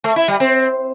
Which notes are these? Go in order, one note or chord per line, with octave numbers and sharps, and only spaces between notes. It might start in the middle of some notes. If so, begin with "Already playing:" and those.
A3
E4
G3
C4